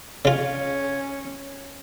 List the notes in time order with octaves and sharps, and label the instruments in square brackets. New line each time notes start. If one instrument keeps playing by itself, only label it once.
[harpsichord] C#3 F4 [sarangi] C#4